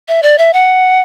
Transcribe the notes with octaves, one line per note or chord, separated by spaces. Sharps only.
E5
D5
E5
F#5